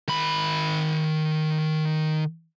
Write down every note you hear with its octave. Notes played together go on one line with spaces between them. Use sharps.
D#3 B5